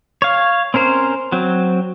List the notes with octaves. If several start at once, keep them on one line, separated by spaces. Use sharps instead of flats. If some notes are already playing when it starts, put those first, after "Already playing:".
C#5 F5
C4 C#4 A#4 C5
F#3 C4